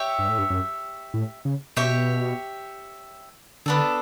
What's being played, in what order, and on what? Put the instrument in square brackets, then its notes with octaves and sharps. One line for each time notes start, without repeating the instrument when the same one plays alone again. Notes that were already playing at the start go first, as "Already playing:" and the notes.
Already playing: [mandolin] G4 C#5 E5
[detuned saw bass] G2
A2
G2
F#2
A2
C#3
[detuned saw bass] B2 [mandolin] G4 C#5 E5
[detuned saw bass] D3 [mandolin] B3 D4 A4